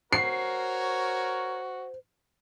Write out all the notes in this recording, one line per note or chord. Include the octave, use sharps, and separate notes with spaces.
F#4 A#4 C5 C#5 C7